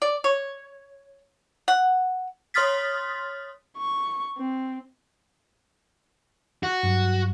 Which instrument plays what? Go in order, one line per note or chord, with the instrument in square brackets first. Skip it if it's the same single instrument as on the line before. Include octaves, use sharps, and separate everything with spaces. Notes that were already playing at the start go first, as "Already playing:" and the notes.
[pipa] D5
C#5
F#5
[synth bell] C#5 C6 D#6 F6 A6 B6
[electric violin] C#6
C4
[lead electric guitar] F#4
[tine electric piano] G2 F#3